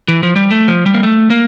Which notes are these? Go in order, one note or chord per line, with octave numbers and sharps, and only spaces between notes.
E3
F3
G3
A3
F3
G3
A#3
A3
A#3